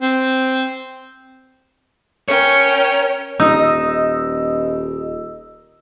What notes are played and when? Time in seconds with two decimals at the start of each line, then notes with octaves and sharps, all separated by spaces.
0.02 C4
2.28 C#4 A#4 C#5 G5
3.40 D#1 D#4 D#5 E6